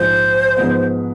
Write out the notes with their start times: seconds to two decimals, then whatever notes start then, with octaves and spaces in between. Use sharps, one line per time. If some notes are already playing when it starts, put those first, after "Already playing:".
Already playing: A#1 G#2 F3 C5
0.57 G#2 F3 G#3 B3